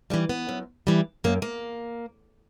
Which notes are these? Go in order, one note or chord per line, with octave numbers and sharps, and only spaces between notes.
E3 G3 D4
B3
F#2
E3 G3
F#2 A#3
A#3